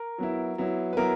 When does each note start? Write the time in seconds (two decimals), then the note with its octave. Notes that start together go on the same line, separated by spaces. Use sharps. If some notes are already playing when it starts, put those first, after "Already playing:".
Already playing: A#4
0.18 F#3 B3 E4
0.58 F#3 B3 E4
0.93 B4
0.97 F#3 B3 E4 A#4